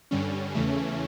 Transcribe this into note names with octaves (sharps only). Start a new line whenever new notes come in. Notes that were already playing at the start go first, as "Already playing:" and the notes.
G2 D3 G3 C#4
E2 C#3 E3 A3